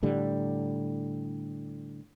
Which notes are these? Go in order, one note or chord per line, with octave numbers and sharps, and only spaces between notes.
A2 D3 G3